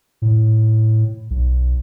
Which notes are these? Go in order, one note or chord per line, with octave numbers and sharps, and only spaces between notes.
A2
B1